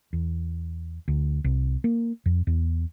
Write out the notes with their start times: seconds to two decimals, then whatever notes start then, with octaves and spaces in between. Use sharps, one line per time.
0.13 E2
1.08 D2
1.44 C2
1.84 A#3
2.26 F2
2.47 E2